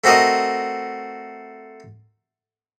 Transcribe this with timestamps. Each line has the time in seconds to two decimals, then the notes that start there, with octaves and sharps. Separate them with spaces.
0.04 A3 C4 F#4 A#4 D#5